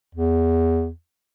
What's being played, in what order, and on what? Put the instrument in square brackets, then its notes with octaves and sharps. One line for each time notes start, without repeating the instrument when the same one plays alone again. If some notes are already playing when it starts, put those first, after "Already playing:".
[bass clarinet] E2